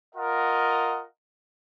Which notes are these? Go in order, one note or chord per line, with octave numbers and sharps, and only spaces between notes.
F4 A#4 D#5 F#5